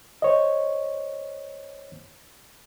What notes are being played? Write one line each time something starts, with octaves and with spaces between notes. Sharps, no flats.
C5 C#5 D#5